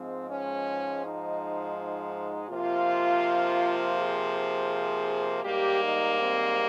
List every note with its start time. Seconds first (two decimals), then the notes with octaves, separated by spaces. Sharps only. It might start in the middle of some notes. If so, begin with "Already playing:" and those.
Already playing: G#2 F3 G#3 C4
0.27 C#4
1.02 D#4
1.75 D#4
2.49 C3 F3 A#3 F4
3.97 G#4
5.45 G#2 G3 A#3 G4
5.82 D#4
6.19 C4